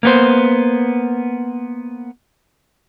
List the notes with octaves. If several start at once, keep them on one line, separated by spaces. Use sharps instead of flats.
A#3 B3 C5